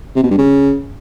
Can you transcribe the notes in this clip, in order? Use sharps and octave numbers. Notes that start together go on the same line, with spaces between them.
C3
B2
G2
C#3